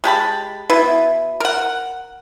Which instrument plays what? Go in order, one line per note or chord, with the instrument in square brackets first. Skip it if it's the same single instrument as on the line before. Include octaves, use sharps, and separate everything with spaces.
[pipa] G#3 G4 A5 B5
B2 E4 B4
A#4 F#5